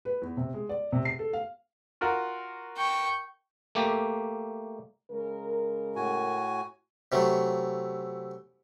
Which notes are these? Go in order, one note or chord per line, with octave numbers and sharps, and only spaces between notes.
B4
E2
C3
G#3
D5
C3
C7
A4
F5
F4 F#4 A#4
G5 C#6
A3 A#3 G4
C#3 G#3 A#4
A2 F#4 G#5
C3 E3 F#3 A3